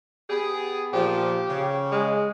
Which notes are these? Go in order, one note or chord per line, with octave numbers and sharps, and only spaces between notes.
B3 G4 G#4
A#2 F3 G4
C#3
G#3